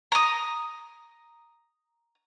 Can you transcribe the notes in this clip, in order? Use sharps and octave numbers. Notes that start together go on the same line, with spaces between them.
A#5 D#6